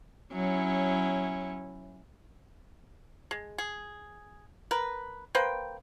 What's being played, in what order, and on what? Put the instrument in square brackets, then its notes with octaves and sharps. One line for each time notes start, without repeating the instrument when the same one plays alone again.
[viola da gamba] F#3 C#4 E4
[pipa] G#3
G#4
A#4 B4
A#3 B4 C5 G5